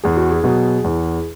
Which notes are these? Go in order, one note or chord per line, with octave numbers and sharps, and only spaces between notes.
E2 G#4
F#4
G#4
B2 F#3
E2